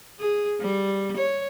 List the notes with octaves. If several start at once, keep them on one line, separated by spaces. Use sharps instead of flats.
G#4
G3
C#5